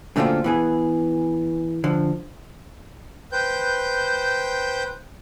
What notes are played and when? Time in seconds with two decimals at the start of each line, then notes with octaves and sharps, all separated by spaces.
0.16 F#2 D3 A3 A#3 C4 F4
0.44 E3 B3 G#4
1.84 D3 F3
3.32 B4 C5 G5 G6